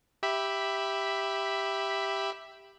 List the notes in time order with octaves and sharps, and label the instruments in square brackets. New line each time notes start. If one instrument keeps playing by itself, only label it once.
[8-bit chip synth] G4 E5 B5